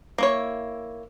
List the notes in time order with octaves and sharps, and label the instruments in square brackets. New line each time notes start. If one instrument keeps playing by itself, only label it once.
[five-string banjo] A#3 E4 C#5